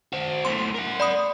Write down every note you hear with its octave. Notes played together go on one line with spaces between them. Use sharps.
F#4 C5
B1 A2 C6
A#4 F#5
D5 B5 D#6